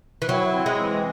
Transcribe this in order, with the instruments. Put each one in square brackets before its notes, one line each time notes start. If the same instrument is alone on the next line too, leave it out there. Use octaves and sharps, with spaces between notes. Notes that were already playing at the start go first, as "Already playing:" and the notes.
[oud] E3
[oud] F#3 [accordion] E4
[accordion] C4
[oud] G#3
[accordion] E3